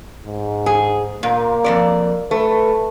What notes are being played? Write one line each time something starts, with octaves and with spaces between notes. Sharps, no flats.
G#2
G#4
A#2 A#3
F2 C3 D5
A3 B4